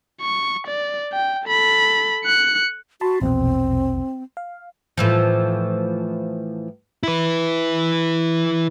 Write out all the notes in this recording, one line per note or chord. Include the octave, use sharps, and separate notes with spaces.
C#6
D5
G5
A4 B5
F#6 C#7
F#4 A5 B5 C6
A#1 E2 B2 C4
F5
A2 E3 F3
E4 B4